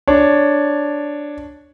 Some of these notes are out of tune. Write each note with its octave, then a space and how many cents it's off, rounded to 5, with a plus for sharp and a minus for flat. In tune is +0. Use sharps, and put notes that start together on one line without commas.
D4 +0 C#5 +0